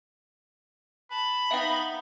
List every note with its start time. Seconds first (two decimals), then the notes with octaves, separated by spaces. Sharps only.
1.11 A5 B5
1.51 B3 D#4 E5 F5 G5